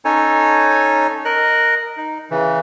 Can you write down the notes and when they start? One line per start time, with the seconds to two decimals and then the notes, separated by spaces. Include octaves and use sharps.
0.05 C#4 D#4 A4 C#5 G#5
1.25 A#4 D#5 F#6
1.97 D#4
2.30 C#3 E3